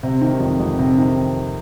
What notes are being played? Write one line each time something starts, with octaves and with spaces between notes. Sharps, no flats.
C3
D#3
F2
F2
C3
D#3